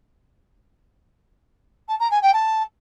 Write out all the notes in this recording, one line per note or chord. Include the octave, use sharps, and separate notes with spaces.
A5
A#5
G#5
G5
A5